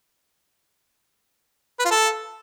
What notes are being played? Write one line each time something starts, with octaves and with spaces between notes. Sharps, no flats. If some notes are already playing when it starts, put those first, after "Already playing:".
B4
F4
A4